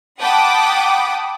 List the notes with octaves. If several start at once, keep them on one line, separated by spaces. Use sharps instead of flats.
F#5 G5 A5 B5 D6 D#6